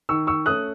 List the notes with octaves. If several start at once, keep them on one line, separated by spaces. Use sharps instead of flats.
D#3 C#6 E6
C#6 E6
A3 C#4 D#6 F#6